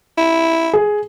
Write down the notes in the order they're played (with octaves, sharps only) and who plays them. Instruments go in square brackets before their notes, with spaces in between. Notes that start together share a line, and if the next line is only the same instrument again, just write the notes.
[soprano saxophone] E4
[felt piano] G#4